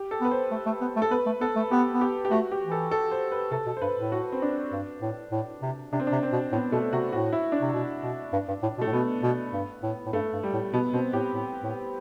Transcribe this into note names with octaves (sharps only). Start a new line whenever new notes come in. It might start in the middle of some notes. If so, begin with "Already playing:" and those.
Already playing: G4
A4
B3 B4
C5
A3
A3
B3
A3
A4
B3 B4
A3
B3 A4
A3
B3 G4
B3
G4
G4
A3 F#4
G4
E3
A4
A4
C5
B4
C3 A4
B2
C5
G2 B4
A2
F#4
C4
D4
G2
A2
A2
C3
C3 D4
C4
D4
C3
C4
B2
A2 B3
B2 A3
C3 F#4
A2 F#4
E4
D4
C3
B2
B2
G2
G2
A2
B2
A3
A2
B2 B3
B2
G2
A2
A2
G2 A3
G2
G3
A2
B2 B3
B2 C4
A2 G4
A2
A2